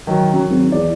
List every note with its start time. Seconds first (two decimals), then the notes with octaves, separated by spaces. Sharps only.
0.07 D#3 F#3
0.33 F#2 F#3
0.50 G#1
0.72 E2 D5